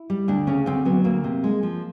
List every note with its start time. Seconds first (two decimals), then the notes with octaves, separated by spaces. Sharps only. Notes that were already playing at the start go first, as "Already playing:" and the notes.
Already playing: E4
0.10 G3
0.28 D2 D4
0.47 C#3 C#4
0.66 D2 C4
0.85 F#3 B3
1.04 D2 A#3
1.24 C3
1.44 G#3
1.63 F3